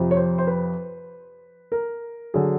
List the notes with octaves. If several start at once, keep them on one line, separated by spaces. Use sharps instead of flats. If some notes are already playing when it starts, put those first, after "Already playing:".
Already playing: F2 C3 F3
C#5
C5
C5
B4
A#4
D3 F#3 G#4